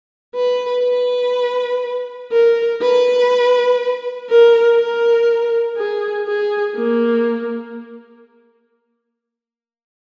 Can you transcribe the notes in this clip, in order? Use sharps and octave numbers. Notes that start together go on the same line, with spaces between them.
B4
B4
A#4
B4
A#4
A#4
G#4
G#4
A#3